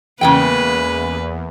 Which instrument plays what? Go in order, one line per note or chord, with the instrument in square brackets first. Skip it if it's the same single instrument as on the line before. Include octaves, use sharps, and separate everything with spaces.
[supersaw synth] E2 [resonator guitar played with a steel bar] C#3 G#3 G5 [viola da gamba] A#3 B4